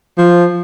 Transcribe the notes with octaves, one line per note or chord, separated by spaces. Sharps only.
F3